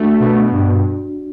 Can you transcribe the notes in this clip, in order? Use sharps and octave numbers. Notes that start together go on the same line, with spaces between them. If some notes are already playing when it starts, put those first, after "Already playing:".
Already playing: A3 D4 F#4
B2
G2